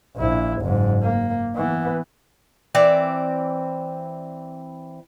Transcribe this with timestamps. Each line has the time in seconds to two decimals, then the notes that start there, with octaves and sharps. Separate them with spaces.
0.16 A#1 E4
0.62 F#1 G#2
1.02 A#3
1.56 E3 B3
2.75 E3 C4 D5